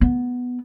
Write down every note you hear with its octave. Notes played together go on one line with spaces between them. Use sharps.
B3